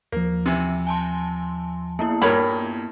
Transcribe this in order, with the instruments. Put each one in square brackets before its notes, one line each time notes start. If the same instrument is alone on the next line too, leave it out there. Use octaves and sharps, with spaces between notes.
[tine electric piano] D#2 F3 [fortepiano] A#3
[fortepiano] C3 E3
[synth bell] G#5 A5 C6
[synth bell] A#3 B3 E4 [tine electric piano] A5
[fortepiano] G2 A#2 [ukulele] A#4 C#5 B5